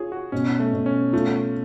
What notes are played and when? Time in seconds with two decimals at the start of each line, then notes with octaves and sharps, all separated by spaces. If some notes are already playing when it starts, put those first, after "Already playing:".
Already playing: F4 G#4 C#5
0.12 F#4
0.32 B2 C#4
0.60 A3
0.73 B2
0.86 C#4
1.13 A3 F4